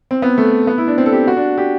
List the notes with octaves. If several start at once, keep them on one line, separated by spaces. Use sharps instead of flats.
C4
B3
A3
B3
E4
D4
C4
A4
G4
F#4
D4
G4